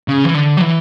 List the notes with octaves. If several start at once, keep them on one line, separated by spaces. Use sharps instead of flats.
C#3
E3
D3
F#3
E3